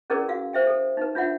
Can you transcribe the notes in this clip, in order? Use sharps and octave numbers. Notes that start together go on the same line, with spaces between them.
C#4 E4 G#4 A#4 B4 D5
F#4 F5
C5 E5 G5
A4
D#4 B4
D4 F4 E5 F#5